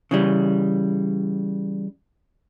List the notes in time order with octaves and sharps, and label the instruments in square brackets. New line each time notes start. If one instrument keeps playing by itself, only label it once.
[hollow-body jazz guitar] C#3 E3 G3